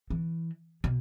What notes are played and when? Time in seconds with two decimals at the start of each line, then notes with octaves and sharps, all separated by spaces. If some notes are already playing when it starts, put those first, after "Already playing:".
0.10 E3
0.84 B2